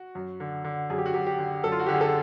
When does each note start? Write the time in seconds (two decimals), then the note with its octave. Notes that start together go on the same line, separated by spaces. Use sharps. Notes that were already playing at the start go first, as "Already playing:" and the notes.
Already playing: F#4
0.15 F#2
0.40 D3
0.64 D3
0.90 F#2 G#4
0.98 G4
1.06 F#4
1.14 F#2 G4
1.26 G4
1.39 D3
1.64 F#2 A4
1.72 F4
1.79 F#4
1.86 D3 G4
1.94 G#4
2.01 A4